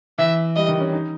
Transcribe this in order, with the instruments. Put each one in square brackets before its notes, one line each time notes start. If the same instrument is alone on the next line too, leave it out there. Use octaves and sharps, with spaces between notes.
[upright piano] E3 [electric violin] E5
[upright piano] G3 [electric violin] D#5
[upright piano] D#3
C#4
D#4